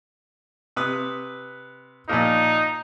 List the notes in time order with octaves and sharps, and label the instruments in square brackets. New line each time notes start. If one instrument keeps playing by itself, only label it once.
[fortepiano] C3 B4 D#6
[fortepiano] A#2 F3 A#3 [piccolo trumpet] D#4